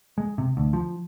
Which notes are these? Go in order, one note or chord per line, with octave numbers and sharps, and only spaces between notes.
G#3
C3
D2
F3